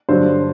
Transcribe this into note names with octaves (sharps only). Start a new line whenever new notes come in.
G2 D3 F#3 C5